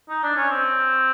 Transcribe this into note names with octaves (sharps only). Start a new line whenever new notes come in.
D#4
D4
C#4
C4